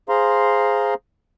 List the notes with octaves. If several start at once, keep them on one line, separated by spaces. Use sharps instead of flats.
G#4 C5 F5 A#5 C6